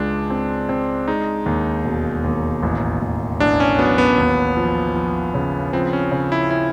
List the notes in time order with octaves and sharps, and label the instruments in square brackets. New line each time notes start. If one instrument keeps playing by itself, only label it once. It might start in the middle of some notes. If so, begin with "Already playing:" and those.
Already playing: [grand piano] C#2 G#3 [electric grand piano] D4
[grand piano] C4
C4
[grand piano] G#3 [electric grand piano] D#4
[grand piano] D#2
E1
D#2
A1
A1
[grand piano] A1 [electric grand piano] D4
[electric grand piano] C#4
[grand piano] F#3 [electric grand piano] B3
[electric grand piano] B3
[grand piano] D#2
F3
F3
C#3
[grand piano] F3 [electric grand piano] C4
[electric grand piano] C#4
[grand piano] C#3
[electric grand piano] E4
E4